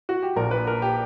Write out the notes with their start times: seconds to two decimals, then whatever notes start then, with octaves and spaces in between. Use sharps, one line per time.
0.09 F#4
0.23 G4
0.36 A#1 A#2 A#4
0.51 B4
0.67 A#4
0.82 G4